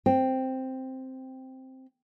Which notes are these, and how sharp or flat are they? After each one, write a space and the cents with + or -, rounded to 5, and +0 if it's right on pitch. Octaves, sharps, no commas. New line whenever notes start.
C4 +0 G5 +0